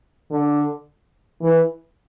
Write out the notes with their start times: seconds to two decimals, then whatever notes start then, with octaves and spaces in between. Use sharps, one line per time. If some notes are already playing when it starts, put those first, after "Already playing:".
0.31 D3
1.42 E3